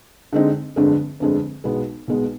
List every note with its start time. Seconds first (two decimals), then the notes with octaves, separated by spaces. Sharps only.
0.33 D3 G#3 C4 D#4
0.76 G1 F2 D3 G#3
1.20 G1 F2 D3 G#3
1.64 B1 B2 G#3 B3
2.08 B1 B2 G#3 B3